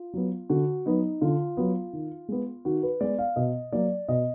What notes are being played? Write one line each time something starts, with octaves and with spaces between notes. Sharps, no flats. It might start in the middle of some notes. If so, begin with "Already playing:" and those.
Already playing: F4
F#3 B3
D3 F#4
F#3 B3 D#4
D3 F4
F#3 B3
D#3
G#3 B3
D#3 F#4
B4
G#3 B3 D5
F5
B2 D#5
F#3 A#3 D5
B2 D#5